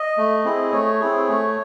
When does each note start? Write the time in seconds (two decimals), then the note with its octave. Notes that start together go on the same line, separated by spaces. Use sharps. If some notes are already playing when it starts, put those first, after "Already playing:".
Already playing: D#5
0.17 A3
0.44 C4 E4 G#4
0.72 A3 C#5
1.00 C4 E4 G#4
1.28 A3